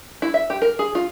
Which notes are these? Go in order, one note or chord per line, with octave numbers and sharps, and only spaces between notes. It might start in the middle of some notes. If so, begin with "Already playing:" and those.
E4
E5
G4
A#4
G#4
F4